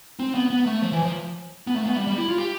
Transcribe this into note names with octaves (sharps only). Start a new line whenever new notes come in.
C4
B3
B3
A3
F3
E3
F3
B3
A3
B3
G3
G3
E4
F4
G4